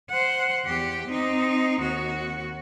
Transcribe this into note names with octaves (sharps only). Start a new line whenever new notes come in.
C5 F#5
E2 G4
C4 D#4
D#2 F#4